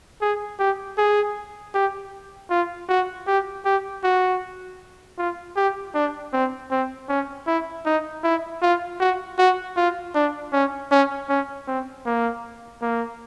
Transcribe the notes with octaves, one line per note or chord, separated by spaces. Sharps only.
G#4
G4
G#4
G4
F4
F#4
G4
G4
F#4
F4
G4
D4
C4
C4
C#4
E4
D#4
E4
F4
F#4
F#4
F4
D4
C#4
C#4
C#4
C4
A#3
A#3